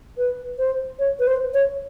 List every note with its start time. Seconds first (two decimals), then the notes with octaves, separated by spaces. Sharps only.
0.18 B4
0.58 C5
0.99 C#5
1.20 B4
1.27 C5
1.54 C#5